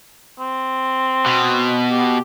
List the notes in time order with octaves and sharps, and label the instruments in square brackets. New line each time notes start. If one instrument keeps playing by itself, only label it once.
[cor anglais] C4
[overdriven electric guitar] B2
[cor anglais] G4